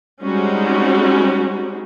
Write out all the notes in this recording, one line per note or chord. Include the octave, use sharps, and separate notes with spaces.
G3 G#3 C4 C#4 D#4 F#4